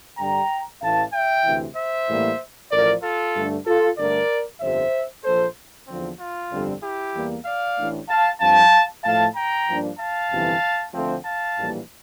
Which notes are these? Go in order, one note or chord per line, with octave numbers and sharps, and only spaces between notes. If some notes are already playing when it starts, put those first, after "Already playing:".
G2 D3 G3 G5 A#5
A1 A2 E3 F5 A5
E5 G5
D2 C3 E3
C5 E5
A2 E3 G3 A#3
A1 A2 F3 A#4 D5
F4 A4
G2 D3 A3 D4
F4 A4
G2 D3 A3 D4 A#4 D5
G1 F2 D3 G3 C5 E5
A#1 A#2 F3 A4 C5
E2 D3 F3 C4
F4
G1 F2 D3 G3 C4
E4 G4
E2 E3 G3 A#3
D5 F5
A1 A2 E3 A3 D4
F5 A5
G2 F3 C4 F5 A5
A2 F3 A3 F5 A5
G5 A#5
G2 F3 A#3 D4
F5 A5
G1 F2 C3 E3
D2 D3 F3 A3 C4
F5 A5
A#1 A2 E3 G3 A#3